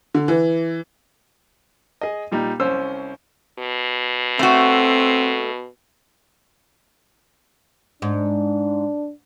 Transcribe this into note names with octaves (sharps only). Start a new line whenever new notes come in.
D3
E3
G#4 D#5
A#2 G3 D#4
C2 C#4 C5 E6
B2
A3 C4 F#4
G#2 D4